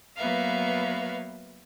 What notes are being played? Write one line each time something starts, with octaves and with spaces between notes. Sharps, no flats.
F#3 A#3 B3 B4 E5 F5